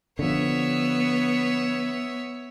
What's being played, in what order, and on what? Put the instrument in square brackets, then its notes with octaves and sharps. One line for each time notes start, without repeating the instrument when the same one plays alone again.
[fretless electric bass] D3 F3 [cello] B3 [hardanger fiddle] C#5 E5